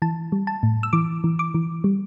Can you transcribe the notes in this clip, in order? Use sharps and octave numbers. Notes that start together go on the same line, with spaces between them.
E3 A5
G3
A5
A2
E6
E3 D6
E3
D6
E3
G3